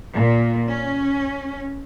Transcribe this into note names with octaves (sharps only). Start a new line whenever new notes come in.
A#2
C#4